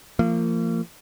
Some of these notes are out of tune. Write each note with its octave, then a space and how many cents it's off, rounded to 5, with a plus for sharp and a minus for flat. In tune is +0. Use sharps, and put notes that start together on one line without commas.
F3 -30 A#3 -35